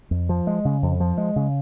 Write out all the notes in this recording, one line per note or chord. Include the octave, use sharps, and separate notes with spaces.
F2
F3
G#3
C#3
F2
F3
G#3
C#3